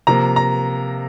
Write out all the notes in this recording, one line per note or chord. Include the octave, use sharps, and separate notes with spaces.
C3 F3 A#3 A#5
A#5